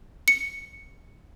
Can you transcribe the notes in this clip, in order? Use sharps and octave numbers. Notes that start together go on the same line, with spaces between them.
C#7